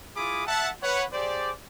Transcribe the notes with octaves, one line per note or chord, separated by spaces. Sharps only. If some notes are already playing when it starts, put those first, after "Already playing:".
E4 F4 G#4 B5 D6 D#6
E5 F#5 A5
B4 C#5 F#5
G4 G#4 C5 D5